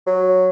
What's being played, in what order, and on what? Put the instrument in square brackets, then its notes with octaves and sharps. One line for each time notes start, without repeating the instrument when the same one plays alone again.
[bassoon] F#3